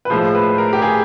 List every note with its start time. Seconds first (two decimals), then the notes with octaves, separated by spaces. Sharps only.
0.05 B4
0.10 A2 F3 G#3 C5
0.35 B4
0.58 A#4
0.73 G4
0.82 G#4